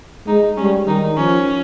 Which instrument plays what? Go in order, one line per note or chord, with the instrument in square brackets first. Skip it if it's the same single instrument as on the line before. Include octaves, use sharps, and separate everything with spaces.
[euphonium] G#3 [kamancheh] D#4
[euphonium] G3 [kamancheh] C#4
[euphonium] D#3 [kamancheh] D#4
[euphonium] F3 [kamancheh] C#4